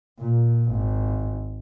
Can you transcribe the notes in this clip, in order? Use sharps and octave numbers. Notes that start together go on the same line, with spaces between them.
A#2
G#1